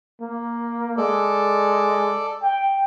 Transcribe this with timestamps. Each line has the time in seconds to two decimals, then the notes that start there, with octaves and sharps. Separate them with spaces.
0.21 A#3
0.97 G#3 A4 D5
2.43 G5